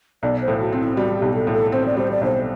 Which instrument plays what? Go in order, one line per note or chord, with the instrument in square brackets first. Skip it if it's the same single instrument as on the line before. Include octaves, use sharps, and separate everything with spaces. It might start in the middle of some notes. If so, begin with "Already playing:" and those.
[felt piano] B1 [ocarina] D5
[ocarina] C5
[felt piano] A2
[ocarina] F#4
[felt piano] C4
[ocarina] E4
[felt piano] G3 [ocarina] F#4
[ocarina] G4
[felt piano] B1
[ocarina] A4
[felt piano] A2
[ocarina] A4
[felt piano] C4 [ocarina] C5
[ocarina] D5
[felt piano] G3 [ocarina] C5
[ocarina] D5
[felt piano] B1 [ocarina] C5